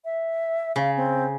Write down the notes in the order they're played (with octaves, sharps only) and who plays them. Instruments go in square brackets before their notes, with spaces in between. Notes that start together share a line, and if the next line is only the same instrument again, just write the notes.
[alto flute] E5
[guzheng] C#3 [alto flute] F5
[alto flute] C4